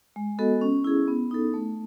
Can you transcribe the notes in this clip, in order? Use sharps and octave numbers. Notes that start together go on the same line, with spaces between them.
G#3
B3 F#4 A4 D#5
C#4
E4 G#4
B3
D#4 A4
A3